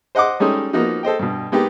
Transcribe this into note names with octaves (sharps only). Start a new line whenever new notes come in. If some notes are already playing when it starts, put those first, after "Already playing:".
C5 D#5 F#5 C6 D6
G3 G#3 C#4 D#4 A4
F3 A#3 B3 D#4 F#4
A4 C5 D#5 G5
G2 B2
G#3 A#3 B3 D#4 G4